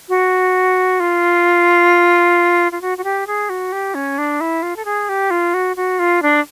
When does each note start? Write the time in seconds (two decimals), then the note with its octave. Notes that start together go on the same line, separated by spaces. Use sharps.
0.09 F#4
1.00 F4
2.72 F4
2.81 F#4
2.98 F#4
3.04 G4
3.27 G#4
3.49 F#4
3.72 G4
3.95 C#4
4.18 D4
4.41 E4
4.62 F4
4.76 A4
4.85 G#4
5.09 G4
5.31 F4
5.54 F#4
5.76 F#4
5.99 F4
6.22 D4